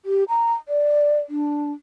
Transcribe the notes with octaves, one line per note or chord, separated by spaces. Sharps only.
G4
A#5
D5
D4